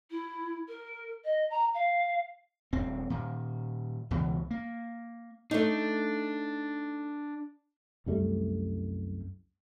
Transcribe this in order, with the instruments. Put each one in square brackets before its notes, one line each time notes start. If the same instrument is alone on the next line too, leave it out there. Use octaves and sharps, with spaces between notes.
[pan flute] E4
A#4
D#5
A#5
F5
[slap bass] D#1 C4
A#2 D#3
C#2 B2 E3
A#3
[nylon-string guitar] A3 D#4 [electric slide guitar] D4
[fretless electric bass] C2 F#2 G3 A3